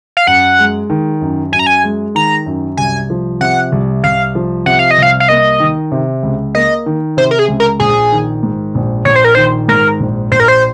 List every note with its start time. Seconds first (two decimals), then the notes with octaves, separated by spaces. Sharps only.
0.17 F5
0.27 F#2 F#5
0.59 G#3
0.90 D#3
1.22 F#2
1.52 F#2 G#5
1.59 A#5
1.67 G#5
1.84 G#3
2.15 D#3 A#5
2.46 F#2
2.77 C2 G#5
3.10 F3
3.41 C3 F#5
3.72 C2
4.04 C2 F5
4.35 F3
4.66 C3 F#5
4.79 F5
4.91 D#5
4.98 C2 F5
5.20 F5
5.29 A#3 D#5
5.60 D#3
5.92 C3
6.23 C#2
6.55 A#3 D#5
6.86 D#3
7.17 C3 C5
7.31 A#4
7.39 G#4
7.48 C#2
7.60 A#4
7.80 A#1 G#4
8.12 D#3
8.43 G#2
8.75 A#1
9.05 A#1 C#5
9.15 C5
9.24 A#4
9.35 D#3 C5
9.68 G#2 A#4
10.00 A#1
10.32 A#1 C5
10.40 A#4
10.48 C5